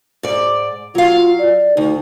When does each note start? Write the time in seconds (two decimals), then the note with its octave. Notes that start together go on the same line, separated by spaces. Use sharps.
0.23 G#2 D5
0.95 F#3 F4 F5
1.39 D5
1.77 D2 D#4